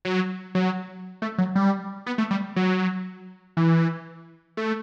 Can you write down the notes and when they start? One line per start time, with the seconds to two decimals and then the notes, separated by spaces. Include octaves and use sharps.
0.05 F#3
0.55 F#3
1.22 A3
1.38 F#3
1.55 G3
2.07 B3
2.18 A3
2.31 G3
2.56 F#3
3.57 E3
4.57 A3